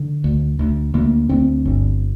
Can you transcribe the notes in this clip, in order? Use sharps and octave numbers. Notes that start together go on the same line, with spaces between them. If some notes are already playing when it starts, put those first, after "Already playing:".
Already playing: D3
D2
D2
D2 A#3
D2 C4
G1